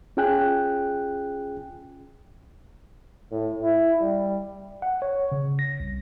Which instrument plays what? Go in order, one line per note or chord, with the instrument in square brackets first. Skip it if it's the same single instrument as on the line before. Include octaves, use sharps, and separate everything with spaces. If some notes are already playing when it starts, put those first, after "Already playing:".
[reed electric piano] C#4 F4 G#4 G5 G#5 F#6
[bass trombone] A2
E4
G3
[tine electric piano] F#5
C#5
C#3
A#6
C2